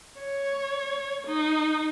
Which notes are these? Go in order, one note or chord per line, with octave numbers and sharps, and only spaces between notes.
C#5
D#4